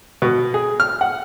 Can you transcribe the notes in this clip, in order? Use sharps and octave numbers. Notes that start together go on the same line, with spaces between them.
B2
G#4
F6
F#5